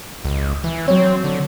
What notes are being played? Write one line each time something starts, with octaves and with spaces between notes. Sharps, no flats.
C#2
E3
F#3 C4 C#5
D3